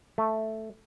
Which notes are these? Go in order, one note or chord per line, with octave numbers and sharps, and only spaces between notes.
A3